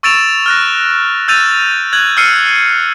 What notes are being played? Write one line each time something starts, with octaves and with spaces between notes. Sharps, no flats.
C#6 E6 A6 D7 E7 F7
F6 F#6 A#6
E6 G6 A6 D#7 F7
F#6 G#6 F#7
E6 F6 C7 C#7 D#7